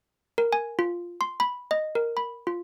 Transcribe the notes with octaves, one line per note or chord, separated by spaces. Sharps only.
A#4
G#5
F4
C6
B5
D#5
A#4
B5
F4